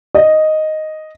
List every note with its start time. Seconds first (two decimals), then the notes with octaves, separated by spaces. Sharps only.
0.15 D#5